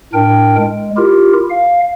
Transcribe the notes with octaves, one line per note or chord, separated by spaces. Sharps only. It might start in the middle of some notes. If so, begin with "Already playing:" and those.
A2 D4 A#4 G5
G#3
E4 F4 G4 A#4
F5